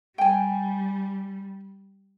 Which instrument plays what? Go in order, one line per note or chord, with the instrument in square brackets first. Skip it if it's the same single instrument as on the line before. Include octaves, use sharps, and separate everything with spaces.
[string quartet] G3 [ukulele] G5 G#5